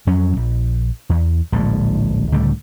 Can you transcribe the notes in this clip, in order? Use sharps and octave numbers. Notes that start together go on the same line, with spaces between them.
F2 F#3 C#4
A#1
E2
D1 A#1 A2 G#3
C#2 A2 D3 G3